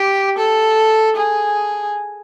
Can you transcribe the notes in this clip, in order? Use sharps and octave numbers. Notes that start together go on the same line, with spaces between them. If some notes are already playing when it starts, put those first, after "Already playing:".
Already playing: G4
A4
G#4